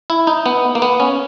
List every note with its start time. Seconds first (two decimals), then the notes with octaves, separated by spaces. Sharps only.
0.10 E4
0.27 D#4
0.46 B3
0.75 A#3
0.82 B3
1.00 C#4